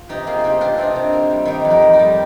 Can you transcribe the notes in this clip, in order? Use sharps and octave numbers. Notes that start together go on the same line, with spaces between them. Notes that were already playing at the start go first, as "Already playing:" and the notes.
Already playing: F4
C3 D#4 G4
A#3 F4 G#4
C3 D#4 G4
C3 D4 F4
C3 C4 D#4
C3
A#3
G3
D#3 D#4 G4
F2
G4 A#4
F2
D#4 G4
G3